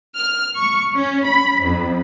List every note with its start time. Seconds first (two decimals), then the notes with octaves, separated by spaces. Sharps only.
0.13 F6
0.54 C#6
0.94 C#4
1.27 B5
1.61 F2